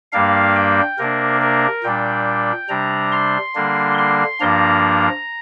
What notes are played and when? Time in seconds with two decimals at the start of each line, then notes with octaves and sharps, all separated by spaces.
0.12 G2 G3 A#3 D4 F5
0.55 G5
0.98 C3 A#3 D4 A#4
1.41 A#4
1.84 A#2 G3 D4 G5
2.69 C3 G3 D4 A#5
3.12 C6
3.55 D3 G3 A#3 D4
3.98 C6
4.40 G2 F3 A#3 D4 A#5